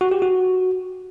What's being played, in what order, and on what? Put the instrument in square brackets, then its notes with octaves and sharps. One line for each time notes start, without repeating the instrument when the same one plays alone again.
[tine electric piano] F#4
G4
F#4